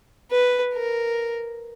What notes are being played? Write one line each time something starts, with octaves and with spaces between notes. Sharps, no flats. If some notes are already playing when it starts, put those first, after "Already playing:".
B4
A#4